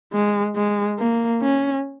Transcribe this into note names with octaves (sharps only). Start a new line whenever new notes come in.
G#3
G#3
A#3
C#4